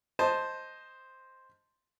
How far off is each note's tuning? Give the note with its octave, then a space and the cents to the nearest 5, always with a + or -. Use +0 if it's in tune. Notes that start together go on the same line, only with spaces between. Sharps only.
C5 +0 D#5 +0 A5 +0